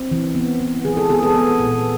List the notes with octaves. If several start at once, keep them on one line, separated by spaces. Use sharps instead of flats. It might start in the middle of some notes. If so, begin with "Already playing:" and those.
Already playing: C4
E3
B3
B3
E3 G#4
A4
B3 G#4
A4
B3
A#2